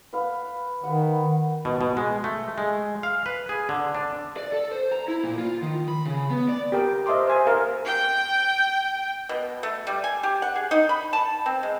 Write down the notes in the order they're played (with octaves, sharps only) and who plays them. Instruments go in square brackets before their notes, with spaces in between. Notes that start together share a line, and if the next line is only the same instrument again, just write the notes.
[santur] B4 F5
[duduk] D#3 [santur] B4 F#5
[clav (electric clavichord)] B2
B2
G#3
A3
G#3
F5
B4
G#4
D3
D4
[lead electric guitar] D5
A4
C5
A#5
E4
A#2
F4
D#3
B5
C#3
B3
D5
[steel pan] G4 A#4 G5
C5 D#5 E5 A5 C6 D6
C5 G#5
A#4 F5
[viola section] G5
[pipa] B2
A3
G3
G#5
G4
F#5
G#4
D#4
B5
A5
C4
G#3